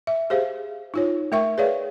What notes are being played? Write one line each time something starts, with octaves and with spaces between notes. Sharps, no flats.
E5
G4 G#4 C5 F5
D#4 F4 C#5
A3 A#4 E5 G5 C#6
G#4 B4 C#5 D5 F5